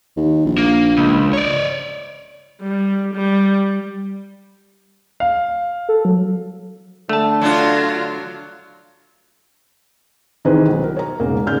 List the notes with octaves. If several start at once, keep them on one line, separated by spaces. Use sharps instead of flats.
D#2
A#1
A#3
C#2
C#5 D5
G3
G3
F5
A4
F#3
D3 A3 A5
F#3 D4 F4
C3 D#3 E3 C4 G#4 B4
B1
A#4
C#5 A#5
E1 G#2 C#3 A#3
G#2 C#3 D5 F6 G6